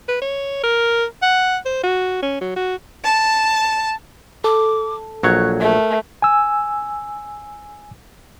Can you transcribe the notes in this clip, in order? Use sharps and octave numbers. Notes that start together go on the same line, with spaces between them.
B4
C#5
A#4
F#5
C5
F#4
C#4
F#3
F#4
A5
A4 D6
A#1 F#3 C#5 F#6
A3 A#4
G#5 E6